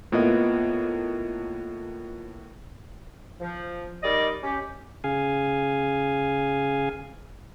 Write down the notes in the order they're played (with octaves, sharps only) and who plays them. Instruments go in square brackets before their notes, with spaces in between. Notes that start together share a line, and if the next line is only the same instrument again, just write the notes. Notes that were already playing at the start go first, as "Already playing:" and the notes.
[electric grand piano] A2 A#3 B3 [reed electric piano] F4 D#5
[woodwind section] F3
D#3 G3 D5 D#5
C#4 G4
[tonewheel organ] C#3 G#4 F5 G#5